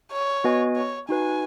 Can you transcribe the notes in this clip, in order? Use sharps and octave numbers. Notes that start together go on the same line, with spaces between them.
C#5
B3 F#4 B4 D#5 G#5
C#5
D#4 F#4 B4 G#5